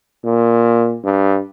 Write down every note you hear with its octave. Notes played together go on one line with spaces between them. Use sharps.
A#2
G2